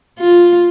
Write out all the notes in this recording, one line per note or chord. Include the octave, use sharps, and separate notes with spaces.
F4